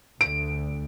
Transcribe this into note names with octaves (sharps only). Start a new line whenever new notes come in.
D2 D7